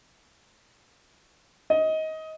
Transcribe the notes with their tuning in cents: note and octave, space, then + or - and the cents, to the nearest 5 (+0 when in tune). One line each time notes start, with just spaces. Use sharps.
D#5 +20